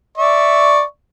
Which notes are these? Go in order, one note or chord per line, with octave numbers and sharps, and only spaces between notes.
D5 E5 C#6